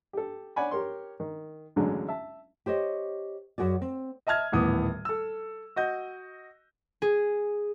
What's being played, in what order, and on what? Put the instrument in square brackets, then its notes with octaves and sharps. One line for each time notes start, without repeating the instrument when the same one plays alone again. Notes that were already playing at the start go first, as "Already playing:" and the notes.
[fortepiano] G4 A4
C#5 D5 F#5 G#5 B5
G4 A#4 C#5 C6
D#3
A1 D2 D3 F#3 G#3
E5 A5
[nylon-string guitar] G4 C5 C#5 D#5
F#2 F#4 G#4 D5
C4
[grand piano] D#5 E5 A5 F6 G#6
D#1 A2 E3 B3 D6 D#6
A4 E6
F#4 D#5 G6
[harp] G#4